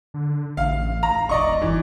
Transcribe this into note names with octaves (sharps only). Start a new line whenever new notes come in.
D3
A1 F5
A#5
E1 D5 D#5 C#6
G1 E3